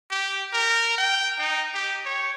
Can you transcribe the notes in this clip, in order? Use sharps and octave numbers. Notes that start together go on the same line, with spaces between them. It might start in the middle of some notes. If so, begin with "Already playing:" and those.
G4
A#4
G5
D#4
G4
C#5